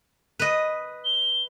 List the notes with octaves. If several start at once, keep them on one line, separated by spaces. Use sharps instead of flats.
B4 D#5
G7